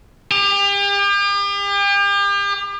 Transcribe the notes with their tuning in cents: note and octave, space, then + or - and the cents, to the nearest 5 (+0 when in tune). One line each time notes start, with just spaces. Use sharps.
G4 +40